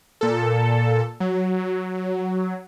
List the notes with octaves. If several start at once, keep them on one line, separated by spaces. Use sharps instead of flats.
A#2 A4
F#3